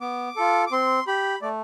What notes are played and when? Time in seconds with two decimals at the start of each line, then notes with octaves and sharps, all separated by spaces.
0.01 B3 D6
0.36 F4 A4
0.67 D6
0.72 C4 C6
1.07 G4 B5
1.42 A3 D5